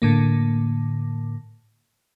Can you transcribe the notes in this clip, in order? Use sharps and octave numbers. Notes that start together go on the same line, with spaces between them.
A2 D3 A#3